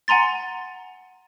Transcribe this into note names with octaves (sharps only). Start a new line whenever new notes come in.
F#5 G#5 A#5 C6 A6